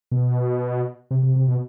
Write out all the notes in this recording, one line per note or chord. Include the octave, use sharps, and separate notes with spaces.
B2
C3
C3
C3
B2